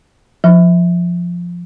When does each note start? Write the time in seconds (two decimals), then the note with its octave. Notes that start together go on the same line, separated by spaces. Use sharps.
0.44 F3